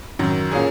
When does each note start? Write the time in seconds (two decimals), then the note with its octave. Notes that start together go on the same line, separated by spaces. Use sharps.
0.19 F#2 D#3 F#3
0.51 A#2 A#3 C#4 G#4